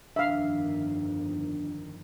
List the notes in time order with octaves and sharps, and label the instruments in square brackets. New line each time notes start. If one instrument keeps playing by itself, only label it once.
[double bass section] G1 F2 D#3 [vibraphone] D4 [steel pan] E5 F5